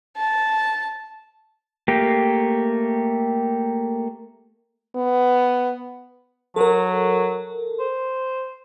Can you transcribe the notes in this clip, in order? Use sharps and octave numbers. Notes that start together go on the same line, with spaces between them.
A5
A3 A#3 G4
B3
F#3 A4 A#4
C5